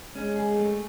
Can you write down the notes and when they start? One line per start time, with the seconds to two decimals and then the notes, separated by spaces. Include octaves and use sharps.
0.15 G#3 C#4
0.36 G#4
0.57 A3